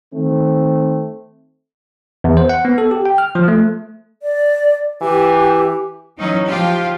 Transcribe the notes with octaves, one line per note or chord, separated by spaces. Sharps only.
D#3 A3 C4
E2
C5
F#5
B3
A4
G4
G5
F6
F3
A3
D5
E3 G4
E3 F#3 C#4 D#4
F3 F4 G4